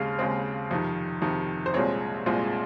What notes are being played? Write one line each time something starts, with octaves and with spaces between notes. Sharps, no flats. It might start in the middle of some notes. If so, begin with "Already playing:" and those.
Already playing: D#2 C#3 G#3 C4 F5
D#2 C#3 G#3 C4
F2 C3 D#3
F2 C3 D#3
C5
C2 A#2 G#3 C4 C#5
C2 A#2 G#3 C4